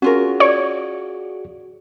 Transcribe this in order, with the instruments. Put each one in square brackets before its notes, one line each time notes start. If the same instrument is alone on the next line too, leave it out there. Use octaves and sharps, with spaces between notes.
[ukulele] C#4 F4 A#4 [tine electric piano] F#4 G#4
[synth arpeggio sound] C#5 [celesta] D5 D7